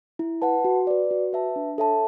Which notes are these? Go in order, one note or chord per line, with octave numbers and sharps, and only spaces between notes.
E4
B4 F#5 A5
F#4
B4 D5
F#4
B4 E5 A5
D4
A4 C#5 E5 A5